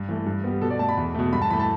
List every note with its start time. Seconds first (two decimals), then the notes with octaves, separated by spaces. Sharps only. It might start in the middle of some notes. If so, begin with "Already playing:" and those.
Already playing: G2
0.09 E3 A3
0.26 G2
0.44 G3 B3
0.61 B2 A4
0.70 D5
0.79 A3 A5
0.89 B5
0.97 E2
1.15 B2 A3
1.33 G2 B5
1.42 A5
1.50 E3 B5
1.53 A3
1.60 A5